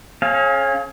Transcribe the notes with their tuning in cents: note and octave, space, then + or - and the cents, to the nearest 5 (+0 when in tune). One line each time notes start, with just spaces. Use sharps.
C#4 -25 G#4 +40 F5 +0